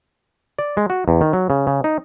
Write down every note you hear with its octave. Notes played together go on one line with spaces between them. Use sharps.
D5
G#3
F#4
E2
D#3
F#3
C#3
C#3
D#4